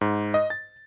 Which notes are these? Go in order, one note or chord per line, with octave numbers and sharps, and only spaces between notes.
G#2
D#5
A6